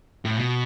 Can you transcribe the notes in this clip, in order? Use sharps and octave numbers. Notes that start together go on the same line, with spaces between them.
A2
B2